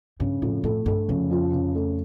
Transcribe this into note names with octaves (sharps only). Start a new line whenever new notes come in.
G2 C#3
F2 A2
A2 A3
G2 A3
F2 C#3
F3
C#3
A3